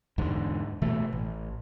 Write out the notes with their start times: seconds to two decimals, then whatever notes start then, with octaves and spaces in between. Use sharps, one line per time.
0.18 E2 G#2 D3
0.82 B2 E3 A3
1.13 A1